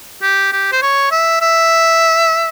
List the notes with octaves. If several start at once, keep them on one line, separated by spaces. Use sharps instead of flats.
G4
G4
C5
C#5
E5
E5